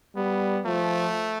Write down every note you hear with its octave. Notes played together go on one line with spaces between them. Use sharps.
G3 B3
F3 A3